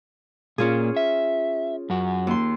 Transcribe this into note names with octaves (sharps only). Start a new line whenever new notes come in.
A#2 A#3 C#4 F4 G#4
E5
F#2 F#4
D#2 C6